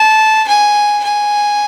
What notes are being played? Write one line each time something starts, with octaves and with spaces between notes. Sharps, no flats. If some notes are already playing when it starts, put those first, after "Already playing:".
Already playing: A5
G#5
G#5